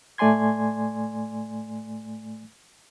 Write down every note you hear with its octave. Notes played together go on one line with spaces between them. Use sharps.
A2 A3 D5 G#5 C6 G#6